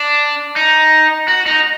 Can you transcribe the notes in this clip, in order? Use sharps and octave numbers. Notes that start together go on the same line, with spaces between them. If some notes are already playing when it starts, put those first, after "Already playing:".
Already playing: D4
D#4
F#4
D#4